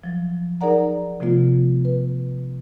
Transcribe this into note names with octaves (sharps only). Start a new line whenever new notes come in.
F3 F#3
D#4 G#4 A#4 D5 F#5 A#5
C3 F3 A3 B3 F4
B4